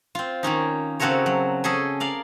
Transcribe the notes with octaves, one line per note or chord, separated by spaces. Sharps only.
C4 F4
D#3 A#3 C#4 D#4
C#3 C4 F#4 A4 A#4 C#5
F#3
C#4 G#4 A4 D#5
A#4 D5 F5